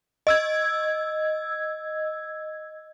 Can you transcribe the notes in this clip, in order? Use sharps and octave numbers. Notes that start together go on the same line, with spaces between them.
D#5 E6 G#6